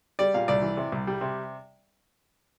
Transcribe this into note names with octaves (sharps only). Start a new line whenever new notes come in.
G3 D5
A#2 F5
C2 D5
E3
C3
C2
G3
C3